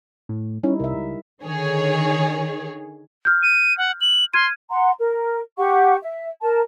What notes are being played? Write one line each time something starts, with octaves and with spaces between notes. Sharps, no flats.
A2
G3 C#4 D#4 E4
C2 A#4 E5
C#2
D3 D#3 G#4 C#5
F6 G6
D#7
F#5
F#7
C6 F6 G#6 D#7
F#5 A#5 C6
A#4
G4 F#5 C#6
E5
A#4 A5